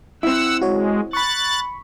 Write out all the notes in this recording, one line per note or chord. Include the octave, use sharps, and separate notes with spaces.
C4 E4 F#5 E6
G#3 F#4 C#5
B5 C#6 F#6 A6